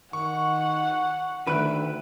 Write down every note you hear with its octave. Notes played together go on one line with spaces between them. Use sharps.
D#3 F#5 C#6
D2 D#3 B4 E5 F#6 D7